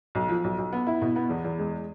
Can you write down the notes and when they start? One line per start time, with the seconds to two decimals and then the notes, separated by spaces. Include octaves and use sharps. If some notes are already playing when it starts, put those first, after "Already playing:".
0.15 B1
0.29 F3
0.44 B1
0.58 B1
0.73 B3
0.87 E4
1.01 B2
1.16 B3
1.29 E2
1.45 E2
1.59 G#3